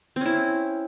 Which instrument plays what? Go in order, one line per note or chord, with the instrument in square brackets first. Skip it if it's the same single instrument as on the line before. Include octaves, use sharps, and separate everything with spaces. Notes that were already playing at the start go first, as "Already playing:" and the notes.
[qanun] C4
C#4
E4